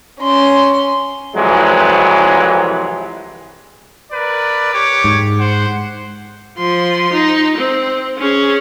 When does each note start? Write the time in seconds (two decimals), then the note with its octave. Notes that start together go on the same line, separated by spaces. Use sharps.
0.21 C#4 C6
1.36 C2 F2 E3 F#3 G#3
4.13 A#4 B4 D5
4.74 G4 C#5 D6
5.04 G#2
5.40 C5 F#5
6.58 F3 C6
7.13 D#4
7.58 C4
8.18 C#4 G#4